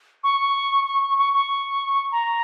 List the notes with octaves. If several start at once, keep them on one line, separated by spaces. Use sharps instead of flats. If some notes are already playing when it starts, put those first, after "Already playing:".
C#6
C#6
C#6
C#6
C#6
A#5